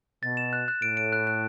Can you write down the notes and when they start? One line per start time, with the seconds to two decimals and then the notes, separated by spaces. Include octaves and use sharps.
0.22 B2 A6
0.37 E7
0.53 F#6
0.68 F#6
0.82 A2 D7
0.97 D7
1.12 F#6
1.27 F#6